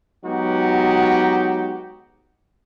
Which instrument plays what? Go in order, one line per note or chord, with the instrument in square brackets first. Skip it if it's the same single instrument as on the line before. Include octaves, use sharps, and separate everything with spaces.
[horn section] F#3 G#3 B3 D#4 F#4 G4